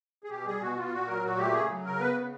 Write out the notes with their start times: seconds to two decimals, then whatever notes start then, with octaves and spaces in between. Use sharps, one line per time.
0.24 G#4
0.30 B2 G4
0.46 G3 G#4
0.61 B2 F#4
0.77 B3 F4
0.92 A#2 F#4
1.08 F#3 A#4
1.23 A#2 F#4
1.38 A3 G4
1.53 C#3 G#4
1.70 F#3
1.84 C#3 A#4
2.00 B3 B4
2.15 C#3